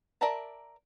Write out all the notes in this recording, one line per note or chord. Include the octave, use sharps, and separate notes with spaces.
A#4 D5 E5 A5 A#5